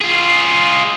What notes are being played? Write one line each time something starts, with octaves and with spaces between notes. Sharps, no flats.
F4 G#4